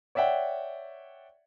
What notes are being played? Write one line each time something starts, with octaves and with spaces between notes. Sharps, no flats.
C#5 D5 E5 F#5 G5